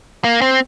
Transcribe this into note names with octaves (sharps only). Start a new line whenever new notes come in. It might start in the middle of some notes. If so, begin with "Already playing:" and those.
A#3
C4